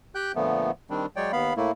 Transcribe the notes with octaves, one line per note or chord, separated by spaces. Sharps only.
G4 G5 F#6 G6
A#2 D3 F3 A3 B3
D#3 G3 C4 D4
F#3 G#3 C#5 D5 G5
D#2 B3 F5 B5
A2 A3 A#3 E4